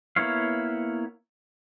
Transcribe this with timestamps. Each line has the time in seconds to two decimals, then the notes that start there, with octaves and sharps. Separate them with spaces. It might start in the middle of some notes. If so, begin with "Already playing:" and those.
0.16 A#3 B3 E4 C#5 F5